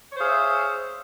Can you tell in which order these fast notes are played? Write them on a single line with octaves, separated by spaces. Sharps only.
C#5 C5 G#4 F5 E5